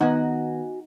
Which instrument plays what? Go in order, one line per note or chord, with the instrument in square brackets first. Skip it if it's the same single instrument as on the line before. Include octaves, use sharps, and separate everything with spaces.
[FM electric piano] D#3 B3 [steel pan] D#4 [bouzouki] F#4 G#5